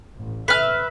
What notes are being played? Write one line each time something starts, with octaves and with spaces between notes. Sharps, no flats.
A1
B4 E5 F6